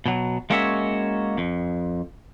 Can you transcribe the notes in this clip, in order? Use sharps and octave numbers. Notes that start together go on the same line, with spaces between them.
B2 F#3
G#3 A#3 C#4 F#4 C#5 E5
F2